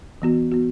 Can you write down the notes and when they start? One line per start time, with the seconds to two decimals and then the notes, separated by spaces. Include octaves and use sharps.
0.22 E3 B3 F#4
0.52 B3 F#4